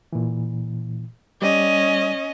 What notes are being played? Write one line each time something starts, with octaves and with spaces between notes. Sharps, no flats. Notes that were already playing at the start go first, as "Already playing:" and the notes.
A#2 E3
G3 C#4 D5 D#5